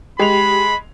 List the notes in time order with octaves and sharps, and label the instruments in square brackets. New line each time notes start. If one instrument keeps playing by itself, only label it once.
[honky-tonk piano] G#3 F7 [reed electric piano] G4 [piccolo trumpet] B5